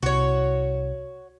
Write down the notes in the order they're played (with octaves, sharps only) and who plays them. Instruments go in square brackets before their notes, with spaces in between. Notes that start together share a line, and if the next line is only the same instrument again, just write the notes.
[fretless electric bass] C2 [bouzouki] F#4 C#5